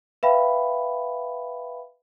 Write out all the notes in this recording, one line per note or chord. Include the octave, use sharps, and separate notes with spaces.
B4 E5 F5 G5 B5